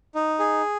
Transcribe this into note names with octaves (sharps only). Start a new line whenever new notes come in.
D#4
G#4